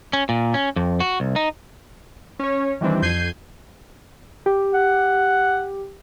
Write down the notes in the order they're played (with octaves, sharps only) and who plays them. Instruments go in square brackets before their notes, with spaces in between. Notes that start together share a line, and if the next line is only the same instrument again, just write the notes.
[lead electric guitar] C#4
A#2
C#4
F2
F#4
C2
D#4
[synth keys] C#4 C#5
D#3 E3 G3 C4 D4
F2 G6 G#6 C7 D#7
G4
[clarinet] F#5